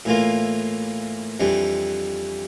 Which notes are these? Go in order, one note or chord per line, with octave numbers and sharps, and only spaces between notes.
A2 E3 A#3 F4
F2 E3 G3 D4